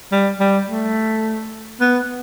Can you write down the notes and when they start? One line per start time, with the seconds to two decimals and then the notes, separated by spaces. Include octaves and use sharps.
0.12 G3
0.40 G3
0.68 A3
1.81 B3